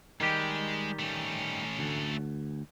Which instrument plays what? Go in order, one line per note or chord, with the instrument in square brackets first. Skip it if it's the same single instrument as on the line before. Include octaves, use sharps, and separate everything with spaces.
[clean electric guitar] D#3 G3 G4 [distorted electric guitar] G#3
[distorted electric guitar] A3 C#4
[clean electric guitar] D2